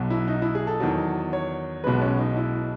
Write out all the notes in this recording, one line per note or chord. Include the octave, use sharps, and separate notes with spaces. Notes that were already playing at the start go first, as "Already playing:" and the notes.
Already playing: B1 B2 F#3
E4
D#4
E4
G#4
A4
E2 D#3 F#3
C#5
B1 B2 G#3 B4
C#4
D#4
E4